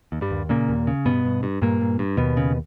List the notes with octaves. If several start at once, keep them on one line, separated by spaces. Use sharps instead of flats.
D#2
G2 G3
D#2
A#2 C#3 A#3
D#2
C#3
G2 B2 B3
G2
G2
G2 A#2 A#3
G2
G2
D#2 B2 B3
C#3